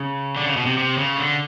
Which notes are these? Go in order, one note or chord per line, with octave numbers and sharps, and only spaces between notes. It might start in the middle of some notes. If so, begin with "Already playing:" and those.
Already playing: C#3
D3
C#3
B2
C3
C3
C#3
D3